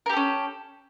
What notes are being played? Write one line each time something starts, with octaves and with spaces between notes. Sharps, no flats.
C#4 G4 A4 A#4